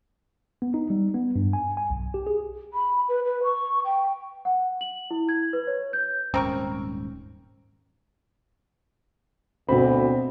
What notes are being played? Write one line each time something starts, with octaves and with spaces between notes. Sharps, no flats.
B3
D#4
G3
B3
G2
G#5
G#5
B1
G4
G#4
B5
B4
B4
C#6
G5
F#5
F#7
E4
G#6
B4
C#5
G6
D#1 G#2 C4 C#4 A#4 C#6
D2 B2 C4 B5